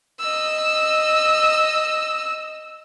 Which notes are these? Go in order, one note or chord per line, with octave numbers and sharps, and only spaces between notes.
D#5 E6